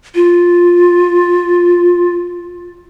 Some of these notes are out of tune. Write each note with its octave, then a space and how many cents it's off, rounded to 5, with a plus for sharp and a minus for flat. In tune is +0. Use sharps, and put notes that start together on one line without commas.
F4 +10